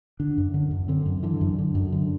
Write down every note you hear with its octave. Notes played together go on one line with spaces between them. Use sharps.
D3 D4
F#2
D3
F#2
D3 C4
F#2
D3 E3
F#2
D3
F#2
D3